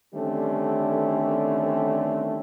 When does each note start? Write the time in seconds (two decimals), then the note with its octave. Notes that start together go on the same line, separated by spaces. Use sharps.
0.14 D3 D#3 G3 A3 C4 C#4